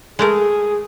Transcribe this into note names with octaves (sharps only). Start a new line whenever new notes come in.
G#3 A3 G#4 A#4